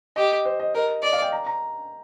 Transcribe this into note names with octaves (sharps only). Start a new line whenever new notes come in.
G4 D#5
C5
D#5
A#4 D#5
D5 D#5
F5
G5
A#5
A#5